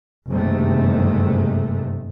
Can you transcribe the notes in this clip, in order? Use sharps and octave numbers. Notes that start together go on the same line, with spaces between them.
F#1 G2 C3 D#3 G#3 A3